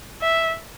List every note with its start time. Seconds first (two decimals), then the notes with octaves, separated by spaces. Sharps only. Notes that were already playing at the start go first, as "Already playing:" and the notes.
0.21 E5